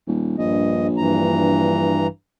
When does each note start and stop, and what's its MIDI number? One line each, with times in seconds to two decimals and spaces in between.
0.07 0.37 27
0.38 2.06 34
0.38 0.87 43
0.38 0.87 75
0.97 2.07 43
0.97 2.07 52
0.97 2.07 82